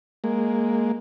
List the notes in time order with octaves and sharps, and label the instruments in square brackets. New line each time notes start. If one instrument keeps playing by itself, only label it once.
[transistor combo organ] G#3 A#3